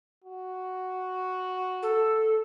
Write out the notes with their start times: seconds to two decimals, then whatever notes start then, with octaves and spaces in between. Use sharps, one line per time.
0.24 F#4
1.83 A4